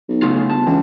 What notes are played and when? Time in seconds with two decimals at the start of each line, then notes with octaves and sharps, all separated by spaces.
0.09 B1
0.22 C#3 A3 F4
0.50 G1 A5
0.67 C#2 E3